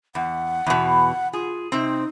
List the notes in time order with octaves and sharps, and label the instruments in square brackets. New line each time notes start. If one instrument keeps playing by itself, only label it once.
[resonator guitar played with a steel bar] E2 [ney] F#5
[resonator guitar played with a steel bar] E2 B2
[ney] F4 [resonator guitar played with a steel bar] G#4
[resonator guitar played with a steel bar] C3 C4 [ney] D#4